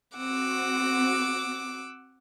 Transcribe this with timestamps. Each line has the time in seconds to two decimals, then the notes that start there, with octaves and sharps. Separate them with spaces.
0.16 C4 F#4 F#5 D6 E6